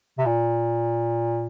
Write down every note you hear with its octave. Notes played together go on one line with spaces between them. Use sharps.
C3
A#2